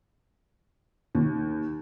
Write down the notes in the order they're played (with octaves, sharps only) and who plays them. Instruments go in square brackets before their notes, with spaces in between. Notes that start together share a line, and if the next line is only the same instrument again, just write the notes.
[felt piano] D#2